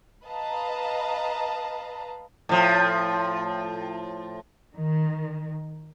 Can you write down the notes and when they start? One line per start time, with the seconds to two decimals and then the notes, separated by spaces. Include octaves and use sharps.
0.25 B4 D#5 F5 A5 A#5
2.49 A2 F3
4.76 D#3